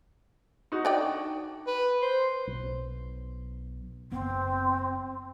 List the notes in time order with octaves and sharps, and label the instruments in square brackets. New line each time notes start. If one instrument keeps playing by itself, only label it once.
[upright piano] D#4 F#4
[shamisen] D4 D5 G5
[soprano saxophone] B4
C5
[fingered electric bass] B1
[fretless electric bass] F#1 B3 [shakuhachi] C4